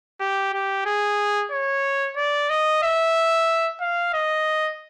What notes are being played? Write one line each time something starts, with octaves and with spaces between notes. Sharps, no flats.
G4
G4
G#4
C#5
D5
D#5
E5
F5
D#5